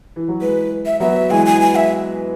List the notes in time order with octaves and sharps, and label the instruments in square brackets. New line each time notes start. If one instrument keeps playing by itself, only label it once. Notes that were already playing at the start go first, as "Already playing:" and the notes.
[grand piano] E3
F#3
[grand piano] E3 G#3 [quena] B4
[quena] E5
[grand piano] F#3 B3 [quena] E5
[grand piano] E3 G#3 [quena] G#5
[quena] G#5
G#5
E5